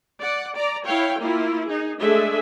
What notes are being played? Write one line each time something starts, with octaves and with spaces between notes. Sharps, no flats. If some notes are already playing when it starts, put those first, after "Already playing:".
D5 F#5
D5 A#5
E4 C#5 F5 G5
A#3 E4 F4
D#4 G#4
G#3 A3 D4 G#4 A4 E5